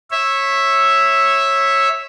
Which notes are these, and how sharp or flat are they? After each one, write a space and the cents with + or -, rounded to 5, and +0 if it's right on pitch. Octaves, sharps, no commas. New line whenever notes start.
C#5 -15 E5 +0